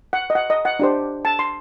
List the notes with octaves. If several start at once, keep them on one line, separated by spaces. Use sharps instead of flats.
F#5
D#5
F#5
D#5
F#5
D4 G4 C5
A5
C6